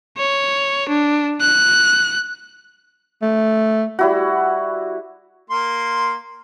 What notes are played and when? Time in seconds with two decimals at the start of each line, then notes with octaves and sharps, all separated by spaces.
0.17 C#5
0.88 D4
1.40 F#6
3.22 A3
3.99 G3 E4 F#4
5.50 A#3 C6